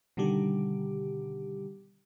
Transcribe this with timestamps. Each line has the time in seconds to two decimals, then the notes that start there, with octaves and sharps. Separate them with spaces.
0.17 B2 D3 D#3 G3 G4